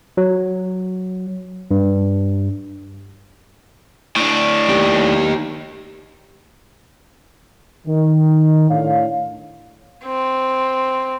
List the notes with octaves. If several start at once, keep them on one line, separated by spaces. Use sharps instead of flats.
F#3
G2
A2 D4
D#3 G4
D#3
A2 A3 D4 C#5 F5
C4